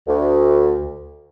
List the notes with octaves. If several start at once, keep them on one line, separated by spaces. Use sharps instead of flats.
D2